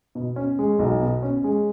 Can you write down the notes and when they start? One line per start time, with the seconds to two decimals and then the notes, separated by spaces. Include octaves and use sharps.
0.15 B2
0.36 C#4
0.59 G#3
0.79 B1
1.00 B2
1.23 C#4
1.44 G#3